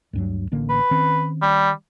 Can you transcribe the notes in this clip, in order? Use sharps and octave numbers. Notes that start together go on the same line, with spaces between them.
D2 G2 F#3
A1 D3 A#3
B4
D#3 C4 C#4
G3